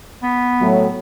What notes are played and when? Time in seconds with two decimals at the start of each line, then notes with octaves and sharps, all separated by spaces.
0.23 B3
0.61 A2 F#3